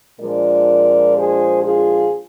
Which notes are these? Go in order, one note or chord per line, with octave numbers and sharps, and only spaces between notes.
A#2 F3 G#3 D4 A#4 D5
G#4 C5
F4 G#4